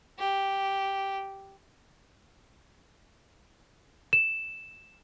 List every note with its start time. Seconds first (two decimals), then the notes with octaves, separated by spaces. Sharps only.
0.19 G4
4.13 E7